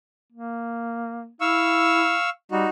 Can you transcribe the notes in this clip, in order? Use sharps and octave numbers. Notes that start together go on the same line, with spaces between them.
A#3
E4 F5 C#6 E6
G3 D#4 F#4